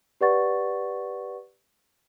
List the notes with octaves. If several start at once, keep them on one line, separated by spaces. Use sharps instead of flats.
G4 B4 D5 F#5 C#6 A6